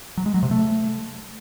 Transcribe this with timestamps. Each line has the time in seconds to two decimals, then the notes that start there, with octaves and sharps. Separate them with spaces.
0.17 F#3
0.26 G#3
0.34 F#3
0.43 C3
0.51 A3